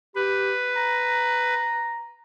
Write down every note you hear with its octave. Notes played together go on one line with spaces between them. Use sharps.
G4 B4
A#5